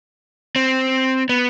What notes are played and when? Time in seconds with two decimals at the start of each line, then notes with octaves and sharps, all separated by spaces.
0.56 C4
1.29 B3